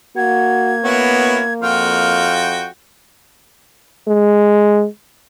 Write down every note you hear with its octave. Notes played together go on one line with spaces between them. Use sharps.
A#3 F#4 G#6
B3 C#4 E4 F#4
F2 F4 F#4 G5 F6
G#3